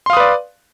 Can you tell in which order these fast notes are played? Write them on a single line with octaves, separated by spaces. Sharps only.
C6 F5 D#6 B4 D5